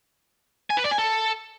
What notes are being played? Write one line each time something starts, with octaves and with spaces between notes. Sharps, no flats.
G#5
B4
D5
G#5
A4